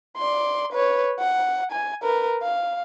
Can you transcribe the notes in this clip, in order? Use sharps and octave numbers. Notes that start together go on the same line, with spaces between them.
D5 C6
B4 C#5
F#5
G#5
A#4 B4
F5